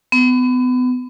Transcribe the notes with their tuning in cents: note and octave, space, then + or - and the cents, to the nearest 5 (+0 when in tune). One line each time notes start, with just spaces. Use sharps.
B3 +30